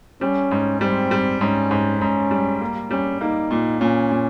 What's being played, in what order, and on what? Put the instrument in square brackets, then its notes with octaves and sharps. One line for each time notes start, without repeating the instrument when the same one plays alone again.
[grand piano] G3 [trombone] C#4
[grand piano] G#2
[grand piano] G3 [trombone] C4
[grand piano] G3
[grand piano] G#2 [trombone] C#4
[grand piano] G#2
[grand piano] G#2 [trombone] C#4
[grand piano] G3
A#3
[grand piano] G3 [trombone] C#4
[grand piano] A#3 [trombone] D#4
[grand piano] A#2
[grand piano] A#2 [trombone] C#4
[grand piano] A#2